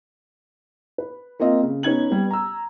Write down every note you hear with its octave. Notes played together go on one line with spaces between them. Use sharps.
B4
A#3 C4 F4 D#5
C#3
B3 C#4 D#4 G#6 F#7
G3 B3
A#5 E6